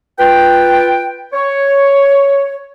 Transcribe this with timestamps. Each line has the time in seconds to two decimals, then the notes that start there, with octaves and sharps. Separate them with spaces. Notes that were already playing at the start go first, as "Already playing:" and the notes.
0.19 F4 B4 G5
1.33 C#5